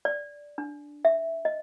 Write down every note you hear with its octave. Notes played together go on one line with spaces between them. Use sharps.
D5
D4
E5
D#5